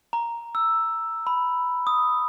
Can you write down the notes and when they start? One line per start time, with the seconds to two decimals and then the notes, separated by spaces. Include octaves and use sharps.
0.13 A#5
0.55 E6
1.27 B5
1.87 D#6